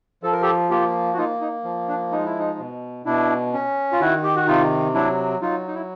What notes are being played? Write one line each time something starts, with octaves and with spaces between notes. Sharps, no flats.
F3 A4
A#4
G4 A4
A#3 F4 G4
F#4
A#3 D#4 F4
D#4
F3
D4
G#3 D#4
E4
D#4
B2
B2 D4 E4
C#4
F4
D#3 E4 F#4
G4
F#4
C3 D#4 F4
F#3 D4 E4
F#3 D#4 F4
D#4
E4